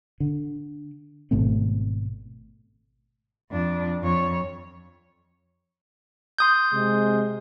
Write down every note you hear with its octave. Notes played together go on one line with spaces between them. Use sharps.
D3
G#1 B2 A3 C4
F2 D4
F2 C#5
C6 D#6 G6
C3 G#3